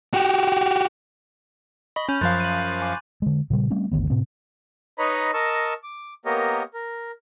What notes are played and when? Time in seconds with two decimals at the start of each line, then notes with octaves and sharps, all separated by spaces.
0.14 F#4 G4
1.96 D#5 B5 C#6
2.09 C#4 B5 G6 F7
2.21 F#2 F3 F5 C6 F#6 A6
2.40 D#7 F#7
2.82 G#5 D6
3.22 D3 G#3
3.50 A#2 C#3 G3
3.70 G3 A3 C4 C#4
3.92 G1 D2 D#3 B3
4.10 A2 C3 C4
4.98 D#4 B4 C#5 D#5 A#5 B5
5.34 A#4 D#5 A5 C#6 E6
5.83 D6
6.25 A#3 B3 G4 A#4 C#5 D#5
6.74 A#4